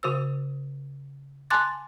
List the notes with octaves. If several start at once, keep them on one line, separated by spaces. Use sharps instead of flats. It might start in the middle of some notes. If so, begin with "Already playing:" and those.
C#3 F#4 C5 E6
G#5 A5 C6 D6 F#6 A6